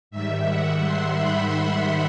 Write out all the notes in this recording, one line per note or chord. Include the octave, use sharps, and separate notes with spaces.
G#2 D#3 G3 E5
F#5
C6
B5